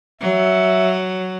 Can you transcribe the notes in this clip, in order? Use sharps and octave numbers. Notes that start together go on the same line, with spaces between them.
F#3 E5